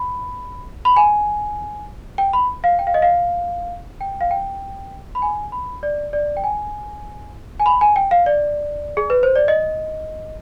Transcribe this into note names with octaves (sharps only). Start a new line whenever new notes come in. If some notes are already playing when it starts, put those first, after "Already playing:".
Already playing: B5
B5
G#5
G5
B5
F5
G5
F5
D#5
F5
G5
F5
G5
B5
G#5
B5
D5
D5
G5
G#5
G#5
B5
G#5
G5
F5
D5
G#4
B4
C5
D5
D#5